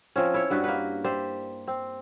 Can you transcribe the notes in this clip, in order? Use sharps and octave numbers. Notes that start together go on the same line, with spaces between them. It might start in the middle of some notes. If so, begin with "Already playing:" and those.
F3 C4 C#4
E4 C#5
G2 B3 F#4 B4
A#3 B4
G4 C5 D5 E5
C4